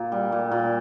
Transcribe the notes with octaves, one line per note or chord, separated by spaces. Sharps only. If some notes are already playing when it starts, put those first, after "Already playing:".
Already playing: A#2
G3
A#2
A#2